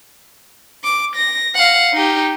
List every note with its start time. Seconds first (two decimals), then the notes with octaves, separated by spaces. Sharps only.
0.84 D6
1.16 A#6
1.55 F5 F#5
1.93 D#4 G4